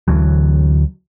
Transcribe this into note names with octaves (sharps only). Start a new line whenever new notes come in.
D2 D3 E3 F#3